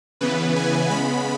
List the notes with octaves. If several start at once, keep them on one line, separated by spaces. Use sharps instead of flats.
C#3 E3 B3 B4
G#5
C#3 G#3 B3 B5